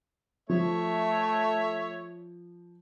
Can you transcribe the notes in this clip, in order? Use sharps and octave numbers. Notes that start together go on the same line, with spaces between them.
F3 A3 C#5 E5